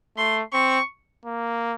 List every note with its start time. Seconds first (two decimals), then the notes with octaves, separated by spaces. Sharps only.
0.17 A3 C6
0.53 C4 C#6
1.26 A#3